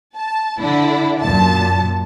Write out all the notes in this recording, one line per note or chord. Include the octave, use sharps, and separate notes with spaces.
A5
D3 D4 E4
F#2 A#2 A5